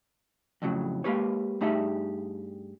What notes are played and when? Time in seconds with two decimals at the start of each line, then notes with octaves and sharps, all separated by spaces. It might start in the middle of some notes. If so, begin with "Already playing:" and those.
0.62 F2 A2 C#3 F#3
1.04 G#3 A#3 G4 B4 C#5
1.61 G2 A3 D#4 G4 G#4 E5